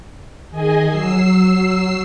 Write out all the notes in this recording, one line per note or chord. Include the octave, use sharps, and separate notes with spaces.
D#3 G#4 D#5 G#5
F#3 E6 C7